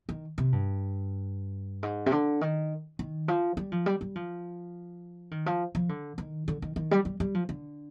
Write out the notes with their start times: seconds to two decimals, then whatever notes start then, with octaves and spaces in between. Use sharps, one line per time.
0.09 D#3
0.38 C3
0.52 G2
1.83 G#2
2.06 C3
2.12 D3
2.41 D#3
2.99 D#3
3.28 F3
3.57 G3
3.72 F3
3.86 G3
4.01 G3
4.15 F3
5.31 D#3
5.46 F3
5.75 F3
5.89 D3
6.18 D#3
6.48 D3
6.62 D#3
6.76 D#3
6.91 G3
7.05 G3
7.20 G3
7.34 F3
7.49 D3